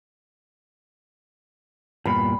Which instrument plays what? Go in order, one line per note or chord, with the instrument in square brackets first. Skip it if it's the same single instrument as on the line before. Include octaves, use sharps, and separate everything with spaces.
[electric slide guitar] E2 G2 A#2 [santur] B5